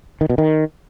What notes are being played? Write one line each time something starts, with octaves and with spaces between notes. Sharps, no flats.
D#3
B2
D#3